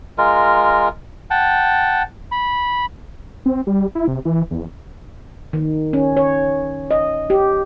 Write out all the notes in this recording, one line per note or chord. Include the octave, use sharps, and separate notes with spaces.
G#3 F4 A#4
F#5 G5 A5
B5
C4
G3
E4
C3
E3
E2
D#3
C#4
C#5
D#5
G4